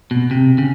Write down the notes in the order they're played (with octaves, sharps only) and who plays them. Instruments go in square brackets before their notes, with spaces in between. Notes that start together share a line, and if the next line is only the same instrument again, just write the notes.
[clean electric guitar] B2
C3
C#3